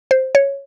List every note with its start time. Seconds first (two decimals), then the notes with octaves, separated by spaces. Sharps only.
0.11 C5
0.35 C#5